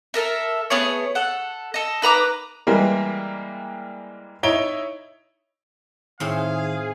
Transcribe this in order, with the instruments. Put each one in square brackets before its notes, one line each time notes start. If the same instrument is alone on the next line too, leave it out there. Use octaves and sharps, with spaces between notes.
[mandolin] A4 A#4 E5
A3 B3 G#4 C#5
A4 F#5
A4 D#5
D#4 B4 A#5 D6
[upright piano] E3 G3 G#3 A#3
D#4 E4 C#5 D7 G7
[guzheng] A2 C4 [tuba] D#3 [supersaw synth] G#4 [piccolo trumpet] F5